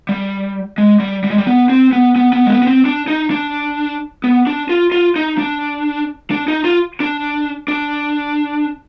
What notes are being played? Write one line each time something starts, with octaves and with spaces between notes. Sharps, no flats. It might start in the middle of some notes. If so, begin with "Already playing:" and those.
G3
G#3
G3
G3
G#3
G3
B3
C4
B3
B3
B3
G#3
B3
B3
C4
D4
D#4
D4
B3
D4
F4
F4
D#4
D4
D4
D#4
F4
D4
D4